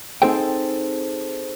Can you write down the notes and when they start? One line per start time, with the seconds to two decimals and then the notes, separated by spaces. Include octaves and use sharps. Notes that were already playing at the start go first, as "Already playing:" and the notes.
0.22 C4 D#4 G#4 A4 C5 G5